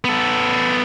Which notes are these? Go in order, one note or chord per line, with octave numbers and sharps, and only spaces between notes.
B3 A4